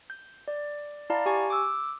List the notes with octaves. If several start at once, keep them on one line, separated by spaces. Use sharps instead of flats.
G6
D5
E4 D5 F5 A5 A#5
G4 G#5 C#6
D6 E6